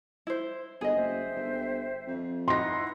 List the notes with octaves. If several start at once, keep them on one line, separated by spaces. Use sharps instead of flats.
E4 C5
G1 G#4 D#5
F#1 C5 E5 G5
G1
F2
D#4 E4 B4 F#5 C6 A#6